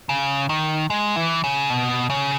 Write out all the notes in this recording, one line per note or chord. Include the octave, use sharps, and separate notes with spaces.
C#3
D#3
G#3
E3
C#3
B2
C#3